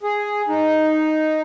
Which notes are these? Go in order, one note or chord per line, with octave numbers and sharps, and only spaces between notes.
G#4
D#4